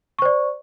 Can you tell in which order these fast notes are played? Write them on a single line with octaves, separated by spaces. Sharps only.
C#6 C5 D5